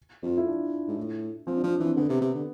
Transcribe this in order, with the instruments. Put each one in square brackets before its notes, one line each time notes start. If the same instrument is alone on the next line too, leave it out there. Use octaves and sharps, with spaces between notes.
[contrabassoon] F2 [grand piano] F4
[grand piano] E4
D4
[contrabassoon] G#2
A2
[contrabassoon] F3 [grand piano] C4
[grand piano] D4
[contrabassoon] F3 [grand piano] C4
[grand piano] D4
[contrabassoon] E3 [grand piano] C4
[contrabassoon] D3 [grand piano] B3
[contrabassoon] C3
C3
D3